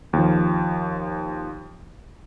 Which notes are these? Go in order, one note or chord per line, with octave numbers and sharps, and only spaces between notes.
D#2 F3